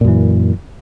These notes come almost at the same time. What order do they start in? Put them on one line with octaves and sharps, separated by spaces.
A#2 F#2 E3